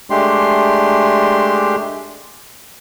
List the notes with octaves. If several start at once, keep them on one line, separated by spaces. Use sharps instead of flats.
G#3 A3 D4 G4 C6